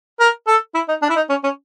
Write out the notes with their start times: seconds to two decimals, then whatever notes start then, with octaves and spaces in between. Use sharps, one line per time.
0.20 A#4
0.47 A4
0.75 E4
0.88 D#4
1.02 D4
1.09 E4
1.16 D#4
1.29 C#4
1.43 C#4